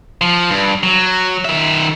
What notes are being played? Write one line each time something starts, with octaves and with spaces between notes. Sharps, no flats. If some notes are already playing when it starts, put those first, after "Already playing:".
F3
G2
F#3
D#3 E5